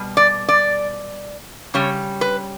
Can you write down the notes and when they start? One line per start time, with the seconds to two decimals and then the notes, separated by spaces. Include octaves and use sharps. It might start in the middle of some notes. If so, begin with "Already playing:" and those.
Already playing: B2 G3
0.17 D5
0.48 D5
1.74 C#3 G3 C#5
2.21 B4